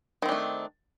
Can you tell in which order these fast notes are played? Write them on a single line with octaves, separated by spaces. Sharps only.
D#3 C4 D4 A3